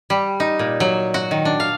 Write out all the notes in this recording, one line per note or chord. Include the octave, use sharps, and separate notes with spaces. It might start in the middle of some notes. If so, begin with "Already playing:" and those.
G3
D#4
A#2
F#3
F#4
D#3
D4
F5